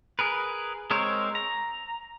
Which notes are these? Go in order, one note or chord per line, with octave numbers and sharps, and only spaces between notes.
G#4 A#4 B4
G#3 C4 A#4 C5 C#5
A#5